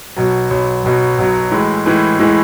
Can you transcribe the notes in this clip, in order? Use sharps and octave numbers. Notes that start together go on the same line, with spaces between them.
B1 B2 F#3
B1 B2 F#3
B1 B2 F#3
B1 B2 F#3
A2 E3 G#3
A2 E3 G#3
A2 E3 G#3